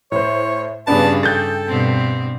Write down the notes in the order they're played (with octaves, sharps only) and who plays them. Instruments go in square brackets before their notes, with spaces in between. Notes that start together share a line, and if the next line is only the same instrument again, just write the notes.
[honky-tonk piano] A2 C5 [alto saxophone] C#5
[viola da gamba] G2 C#3 G#4 [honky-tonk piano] B3 D4 B4 [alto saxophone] A5
[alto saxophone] A4 [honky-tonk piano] G5 G6 A6
[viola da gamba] G2 B2 C4